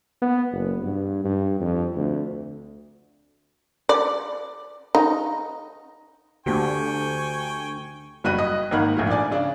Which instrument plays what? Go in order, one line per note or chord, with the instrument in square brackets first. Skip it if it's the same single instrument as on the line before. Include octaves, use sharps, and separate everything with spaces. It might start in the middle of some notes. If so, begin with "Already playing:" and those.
[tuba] B3
F#1
G2
G2
F2
D2
[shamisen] D5
D#4
[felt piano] D2 G4 [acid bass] D3 [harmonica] G5 G#5 C#6
[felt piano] F#1 G3 F#4 F#6 D#7
D#5 D#6
G#1 D#3 A#3 F#5 B5 F6
G#1 D2 A#2 F3
D4 D5 G#5
C#3 D4